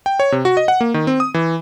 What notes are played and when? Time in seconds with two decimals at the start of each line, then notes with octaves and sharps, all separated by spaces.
0.06 G5
0.20 C#5
0.32 C3
0.45 F#4
0.57 D#5
0.68 F#5
0.81 A#3
0.94 D#3
1.07 C4
1.20 D#6
1.34 E3